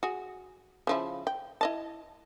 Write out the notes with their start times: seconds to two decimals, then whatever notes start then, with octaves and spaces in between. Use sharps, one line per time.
0.03 F#4 G#4
0.87 C#3 F3 E4
1.27 G5
1.61 E4 D#5 A5